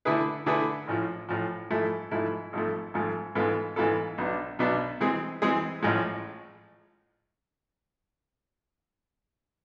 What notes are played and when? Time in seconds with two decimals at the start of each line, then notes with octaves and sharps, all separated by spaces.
0.05 D3 A3 E4 G#4 B4
0.46 D3 A3 E4 G#4 B4
0.88 A1 A2 F3
1.29 A1 A2 F3
1.70 G#2 F3 A3 E4
2.11 G#2 F3 A3 E4
2.53 G#1 G#2 F3 A3
2.94 G#1 G#2 F3 A3
3.35 G#2 E3 B3 F4 A4
3.76 G#2 E3 B3 F4 A4
4.18 B1 B2 B3 D4
4.59 B1 B2 B3 D4
5.00 E3 G#3 C4 G#4
5.42 E3 G#3 C4 G#4
5.83 A1 A2 F3 G#3